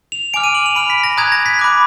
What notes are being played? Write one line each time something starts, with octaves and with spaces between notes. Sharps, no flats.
F7
G#5 D6 F6 D7
D#7
F#7
F7
B5 F6 D7
B6
A#6
A#5 D#6 F#6 G#6
A#6
B6
B5 D6 F#6